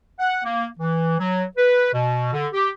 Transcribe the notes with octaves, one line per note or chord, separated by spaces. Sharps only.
F#5
A#3
E3
F#3
B4
B2
D3
G4